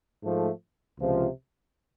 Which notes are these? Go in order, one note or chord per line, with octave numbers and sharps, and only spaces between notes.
G#2 F3 A3
C#2 C3 F3